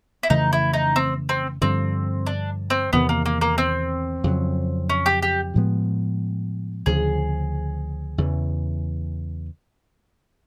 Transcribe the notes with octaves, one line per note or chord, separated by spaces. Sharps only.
E4
F2 C#3 E3 A3 D#4
E4
D#4
C4
C4
G2 D3 F3 C4
D4
C4
E2 C3 D#3 B3
A#3
A#3
A#3
C4
F2 C#3 F#3
C#4
G4
G4
A2 F3 G#3 B3
D2 C#3 F3 G#4
E2 C#3 E3